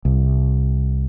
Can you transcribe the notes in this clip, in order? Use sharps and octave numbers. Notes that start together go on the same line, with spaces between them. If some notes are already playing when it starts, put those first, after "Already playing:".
C2